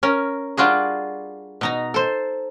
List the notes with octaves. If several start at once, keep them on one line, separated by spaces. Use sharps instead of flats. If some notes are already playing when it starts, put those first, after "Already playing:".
C#4 A#4
G3 D4 F4 F#4 G#4
B2 D#4 A#5
A4 C5